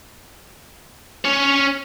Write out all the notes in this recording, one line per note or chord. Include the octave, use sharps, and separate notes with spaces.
C#4 C#5